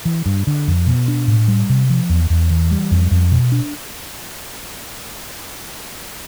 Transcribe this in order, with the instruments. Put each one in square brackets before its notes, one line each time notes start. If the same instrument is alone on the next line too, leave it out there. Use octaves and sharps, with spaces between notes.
[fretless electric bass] E3
G2
D3
F2
B2
D4
A2
G3
C3
F3
E2
E2
E3
G3
F2
F2
B2
D4